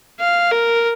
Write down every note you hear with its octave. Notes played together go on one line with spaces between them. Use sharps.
F5
A#4